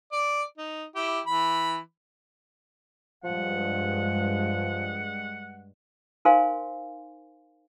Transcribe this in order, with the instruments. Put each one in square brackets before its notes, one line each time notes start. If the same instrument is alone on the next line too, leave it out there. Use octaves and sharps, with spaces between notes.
[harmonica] D5
D#4
E4 G4
E3 B5
[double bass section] G2 G#3 [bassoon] F3 [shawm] F#5
[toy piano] D#4 A#4 C5 F5 G#5 C6